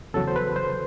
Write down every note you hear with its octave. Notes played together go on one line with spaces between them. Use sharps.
E2 C#3 F#3 A4
C5
B4
C5